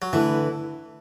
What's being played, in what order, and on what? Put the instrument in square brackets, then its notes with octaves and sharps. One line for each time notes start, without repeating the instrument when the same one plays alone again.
[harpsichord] F#3
[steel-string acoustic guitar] D3 A3 E4 B4 [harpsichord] E3